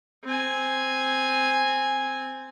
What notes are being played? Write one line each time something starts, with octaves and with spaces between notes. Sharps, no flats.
C4 G#5